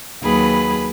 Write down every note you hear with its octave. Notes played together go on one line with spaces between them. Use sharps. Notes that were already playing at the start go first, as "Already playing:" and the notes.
D#2 F#3 G#4 B4 B5